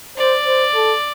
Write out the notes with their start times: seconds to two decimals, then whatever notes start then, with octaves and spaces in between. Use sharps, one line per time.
0.17 C5 D5
0.46 C5
0.75 A4